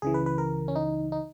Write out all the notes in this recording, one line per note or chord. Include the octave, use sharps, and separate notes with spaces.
C#2 C#3 E3 G#4
B4
B4
A#4
C#4
D#4
D#4